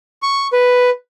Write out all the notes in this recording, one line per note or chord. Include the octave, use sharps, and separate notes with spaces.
C#6
B4